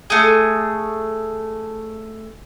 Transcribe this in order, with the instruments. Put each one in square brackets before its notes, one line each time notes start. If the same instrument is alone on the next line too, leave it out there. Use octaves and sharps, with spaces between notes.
[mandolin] A3 G#4